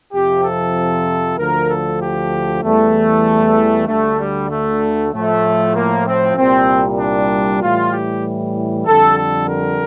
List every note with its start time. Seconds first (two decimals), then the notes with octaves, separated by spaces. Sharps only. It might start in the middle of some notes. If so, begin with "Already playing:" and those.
0.13 F2 C3 F3 G4
0.44 A4
1.38 D2 D3 F3 A#4
1.70 A4
2.01 G4
2.63 E2 E3 G3 A3
3.87 D2 D3 G3 A3
4.19 G3
4.50 A3
5.12 A2 F3 A3
5.75 A#3
6.06 C4
6.37 C2 A#2 G3 C4
7.00 D4
7.62 A2 E3 G3 F4
7.93 G4
8.86 F2 D3 G3 A4
9.18 A4
9.49 A#4